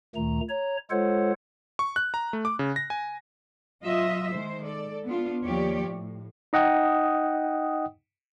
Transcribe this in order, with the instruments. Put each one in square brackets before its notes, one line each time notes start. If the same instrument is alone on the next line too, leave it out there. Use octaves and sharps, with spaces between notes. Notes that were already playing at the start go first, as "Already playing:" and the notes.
[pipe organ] D2 A#2 D#3 A3 A#5
C#5 A#5
G#3 F4 A4 C5 C#5 F#5
[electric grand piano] C#6
F#6
A#5
A3
D6
C#3
A#6
G#5
[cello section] F#3 F4 D#5 E5
D#3 G#3 C5
A4 D5
B3 D4 F4
D#2 F3 G4 C#5 D5
A2
[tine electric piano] D#4 D#5 F#5 G5 D#6